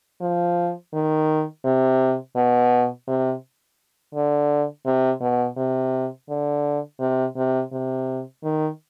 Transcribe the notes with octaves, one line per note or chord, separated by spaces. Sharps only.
F3
D#3
C3
B2
C3
D3
C3
B2
C3
D3
C3
C3
C3
D#3